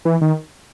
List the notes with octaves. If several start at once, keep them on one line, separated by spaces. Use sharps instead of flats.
E3
D#3